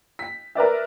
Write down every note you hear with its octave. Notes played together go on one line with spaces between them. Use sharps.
B6
A#4 B4 D5 E5